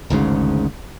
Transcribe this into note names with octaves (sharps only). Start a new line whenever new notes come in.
G#1 D2 G#2 C#3